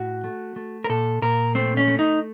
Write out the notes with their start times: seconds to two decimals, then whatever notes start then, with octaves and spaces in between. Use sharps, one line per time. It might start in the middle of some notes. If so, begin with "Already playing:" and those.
Already playing: A2 F#4
0.24 A3
0.56 A3
0.84 A#4
0.89 A#2 A4
1.22 A#2 A#4
1.55 A3 C4
1.77 C#4
1.88 A3
1.99 D#4